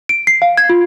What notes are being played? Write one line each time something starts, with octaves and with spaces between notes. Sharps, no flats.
D7
C7
F5
G#6
F4